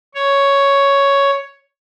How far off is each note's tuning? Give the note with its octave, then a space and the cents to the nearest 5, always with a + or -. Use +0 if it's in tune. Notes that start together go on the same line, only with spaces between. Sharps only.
C#5 +5